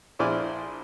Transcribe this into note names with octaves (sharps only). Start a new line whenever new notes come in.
A#1 E4 C5 D5 G#5 F6